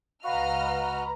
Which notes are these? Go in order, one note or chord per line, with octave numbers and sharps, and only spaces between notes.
C#2 F#4 B4 D#5 F5 A#5 F6